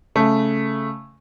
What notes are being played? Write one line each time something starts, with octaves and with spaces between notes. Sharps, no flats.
C#3 A3